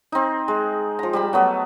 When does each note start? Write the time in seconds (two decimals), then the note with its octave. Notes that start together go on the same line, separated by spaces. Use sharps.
0.12 C4 D#4
0.48 G#3
0.99 F3 A#5
1.13 G3 A5 B5
1.33 F#3 A3 B3